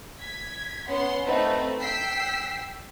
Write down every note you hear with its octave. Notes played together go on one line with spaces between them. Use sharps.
G#6 B6
B3 C#4 F#5 C6
A3 C4 D#4 B4
G5 E6 B6 C7